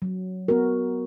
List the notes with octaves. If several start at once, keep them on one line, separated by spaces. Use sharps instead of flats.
F#3
B3 F#4 A#4